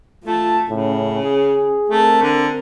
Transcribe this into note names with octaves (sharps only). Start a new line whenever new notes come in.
A3 F4 A5
A2 C#3 C#4
G#4
A3 C4 A#4
D3